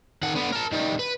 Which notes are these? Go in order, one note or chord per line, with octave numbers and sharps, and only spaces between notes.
D#3 F#5
D3 B3
A#4 A5
D#3 G3
B4